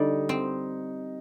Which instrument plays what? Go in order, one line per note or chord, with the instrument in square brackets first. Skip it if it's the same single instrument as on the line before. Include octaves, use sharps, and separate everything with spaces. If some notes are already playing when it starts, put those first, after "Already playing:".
Already playing: [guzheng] D3 G3 [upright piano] D#4
[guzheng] C4